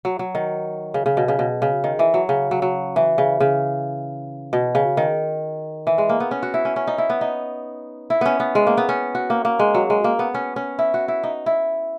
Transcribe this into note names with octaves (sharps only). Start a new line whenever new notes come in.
F#3
F#3
D#3
C#3
C#3
B2
C#3
B2
C#3
D#3
E3
F#3
C#3
F#3
F#3
E3
C#3
C#3
B2
C#3
D#3
E3
G#3
A#3
B3
C#4
F#4
E4
C#4
C#4
D#4
E4
B3
D#4
E4
B3 C#4
B3
G#3
A#3
B3
C#4
F#4
A#3
A#3
G#3
F#3
G#3
A#3
B3
C#4
C#4
E4
F#4
E4
D#4
E4